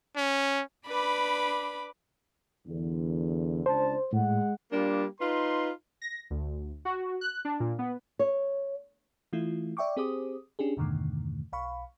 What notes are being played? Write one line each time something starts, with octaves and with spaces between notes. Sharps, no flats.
C#4
D4 B4 B5 D6
E2 D3
C#2 D4 C5 A5
A2 G#3 F#5
G3 A#3 D4 F4
D#4 F4 B4 C6
A#6
D2
F#4
F#6
D4
A#2
B3
C#5
E3 A3 E4 F4
D5 E5 G5 C#6 D6
C4 G4 G#4 C5 D6 D#6
C#4 D4 G4 G#4
E2 G2 B2 D3 D#3 A3
B1 F5 B5 C#6